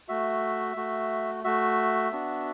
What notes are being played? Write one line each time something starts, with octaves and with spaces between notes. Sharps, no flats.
A3 F#4 E5
A3 F#4
A3 F#4 E5
B3 D4 F#4